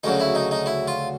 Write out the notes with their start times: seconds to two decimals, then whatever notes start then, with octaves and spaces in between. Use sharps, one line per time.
0.04 D2 C#3 F#3 D#4
0.20 E4
0.35 D#4
0.51 D#4
0.66 E4
0.87 F4